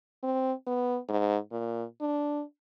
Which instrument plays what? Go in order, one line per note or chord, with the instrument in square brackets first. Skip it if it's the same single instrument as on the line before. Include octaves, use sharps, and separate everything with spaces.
[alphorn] C4
B3
G#2
A#2
D4